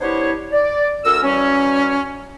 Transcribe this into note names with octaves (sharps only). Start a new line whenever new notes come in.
B3 D4 E4 G4 C5 C#5
D5
D2 A#4 E6
E3 F#3 G3 C#4